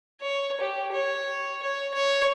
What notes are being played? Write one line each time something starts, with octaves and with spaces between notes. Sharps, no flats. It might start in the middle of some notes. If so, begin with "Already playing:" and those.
C#5
G4
C#5
C#5
C#5